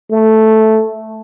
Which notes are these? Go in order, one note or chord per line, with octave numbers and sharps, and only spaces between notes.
A3